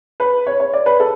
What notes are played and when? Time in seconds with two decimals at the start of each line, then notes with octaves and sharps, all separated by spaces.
0.20 B4
0.47 C#5
0.60 C#5
0.74 D5
0.86 B4
1.00 A4